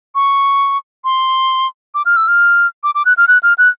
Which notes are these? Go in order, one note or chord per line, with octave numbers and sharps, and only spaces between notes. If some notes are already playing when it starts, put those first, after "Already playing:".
C#6
C6
D6
F6
E6
F6
D6
D6
F#6
F6
F#6
F6
F#6